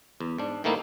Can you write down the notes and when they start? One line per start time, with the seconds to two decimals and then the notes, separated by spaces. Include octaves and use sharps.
0.20 E2
0.38 G#2 D4
0.64 G#2 D#3 A3 A#3 D#4 E4